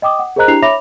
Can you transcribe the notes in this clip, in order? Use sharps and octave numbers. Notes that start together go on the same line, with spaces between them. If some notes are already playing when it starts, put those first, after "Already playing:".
D#5 G5 D6 D#6
F#5
G#4 A#4 C5 D#5 A#5 F#6
D4 E4 G4 A#5 C7 F7
C#5 E5 B5 D6 A#6 F7